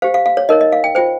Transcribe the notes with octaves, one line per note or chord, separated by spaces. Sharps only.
G4 C5 F5
F5
F5
C#5
D#4 A#4 C#5 D#5
D#5
F5
G5
F4 C5 G5